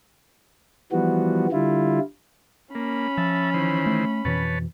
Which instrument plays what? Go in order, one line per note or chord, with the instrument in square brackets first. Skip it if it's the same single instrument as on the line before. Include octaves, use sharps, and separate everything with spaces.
[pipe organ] E3 F3 G3 B3 F#4
D3 G3 E4 F4
[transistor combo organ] A#3 [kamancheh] C#4 B5
[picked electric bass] F3 [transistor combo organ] E5 A5
[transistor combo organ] D#3 E3 C5
[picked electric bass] A3
[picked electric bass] F2 B2 E3 [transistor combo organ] B4 C#5 A5